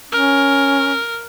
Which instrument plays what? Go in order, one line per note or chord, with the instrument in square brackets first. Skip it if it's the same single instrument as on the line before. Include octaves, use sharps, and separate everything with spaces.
[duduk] C#4 [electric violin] A#4